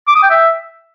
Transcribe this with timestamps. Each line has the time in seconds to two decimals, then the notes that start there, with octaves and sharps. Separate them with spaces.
0.08 D6
0.15 D#6
0.23 G5
0.30 E5